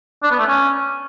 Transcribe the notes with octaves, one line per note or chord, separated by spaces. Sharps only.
D4
B3
A3
C#4